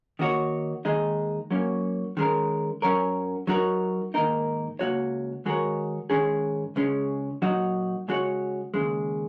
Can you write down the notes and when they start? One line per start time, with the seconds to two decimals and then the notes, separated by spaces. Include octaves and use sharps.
0.19 D#3 A#3 F#4 C#5
0.85 D#2 D#3 G#3 D#4
1.51 F#3 A#3 C#4
2.17 D#3 G#3 C#4 A#4
2.82 F#2 F#3 C#4 A#4 C#5
3.47 F#3 D#4 F#4 A#4 C#5
4.14 G#2 D#3 A#3 D#4 A#4
4.79 C#2 C#3 A#3 F#4 C#5
5.45 D#3 G#3 F#4 A#4 C#5
6.10 G#2 D#3 G#3 C#4 G#4
6.76 C#2 C#3 G#3 C#4
7.42 A#2 F#3 D#4 F#4
8.08 C#3 G#3 F#4 C#5
8.74 D#2 C#3 G#3